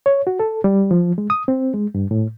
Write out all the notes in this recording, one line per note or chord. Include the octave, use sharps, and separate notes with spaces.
C#5
F#4
A4
G3
F3
G#3
D#6
C4
G#3
G2
A2